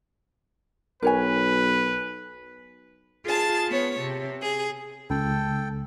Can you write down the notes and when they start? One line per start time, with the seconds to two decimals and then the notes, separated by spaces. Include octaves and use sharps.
1.02 B1 A#4 B4 C#5 G#5
3.26 F4 G#4 A5 A6
3.69 B3 C#5
4.01 C3
4.41 G#4
5.10 C#2 A4 G5